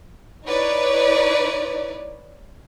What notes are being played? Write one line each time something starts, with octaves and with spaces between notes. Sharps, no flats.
D#4 E4 B4 C#5 D5